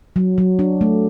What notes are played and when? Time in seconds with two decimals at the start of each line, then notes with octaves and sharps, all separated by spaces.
0.16 F#3
0.38 F#3
0.59 D4
0.81 A3